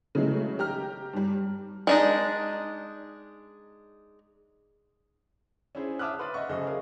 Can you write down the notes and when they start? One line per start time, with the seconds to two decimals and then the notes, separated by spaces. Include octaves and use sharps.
0.15 C#3 E3 F#3 G#3 A3
0.59 G4 A#5 F6
1.13 G2 G3
1.87 G#3 D4 D#4
5.75 C#4 D4 E4 G#4 C5
5.99 E5 A5 D6 D#6 F6 F#6
6.19 B4 C6 D6 F#6 A6
6.34 D#5 E5 F#5 C#6
6.49 F#2 C#3 G#4 A4 C5 D#5
6.66 G#4 A#4 C#5 F5